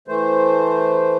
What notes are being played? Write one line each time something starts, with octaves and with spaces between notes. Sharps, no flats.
E3 A3 C5